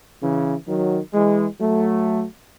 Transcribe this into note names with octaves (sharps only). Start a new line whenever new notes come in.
C#3 E3
D#3 F#3
E3 G#3
F#3 A3